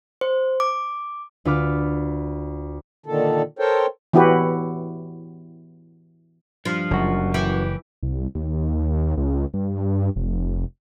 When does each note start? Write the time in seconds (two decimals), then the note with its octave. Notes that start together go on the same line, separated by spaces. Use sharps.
0.21 C5
0.60 D6
1.45 D2 F4 B4 D6 F6
3.06 A#2 D3 D#3 A4
3.59 A4 A#4 C5 C#5 G5
4.13 E3 B3 E4 F#4 G4 B4
6.65 G2 F3 F4
6.91 F#1 F#2 F#4
7.34 E3 G4
8.03 C2
8.35 D#2
9.17 C#2
9.54 G2
10.16 F1